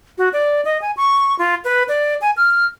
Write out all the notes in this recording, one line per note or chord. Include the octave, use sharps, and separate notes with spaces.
F#4
D5
D#5
G#5
C#6
F4
B4
D5
G#5
F6